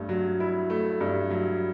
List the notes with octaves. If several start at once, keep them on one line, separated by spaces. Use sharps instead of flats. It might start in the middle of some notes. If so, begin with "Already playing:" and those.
Already playing: G2 A3
F#3
E4
A3
G2
F#3